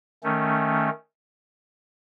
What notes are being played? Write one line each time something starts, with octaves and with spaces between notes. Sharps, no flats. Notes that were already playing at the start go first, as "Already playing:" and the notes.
D#3 A3 C#4